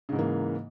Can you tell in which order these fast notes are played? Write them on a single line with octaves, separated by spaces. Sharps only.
C#3 G#2 E3 A#3